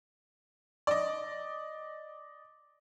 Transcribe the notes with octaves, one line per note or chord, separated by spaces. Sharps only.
D5 D#5